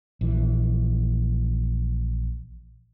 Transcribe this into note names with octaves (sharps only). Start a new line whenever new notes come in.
A#1 E3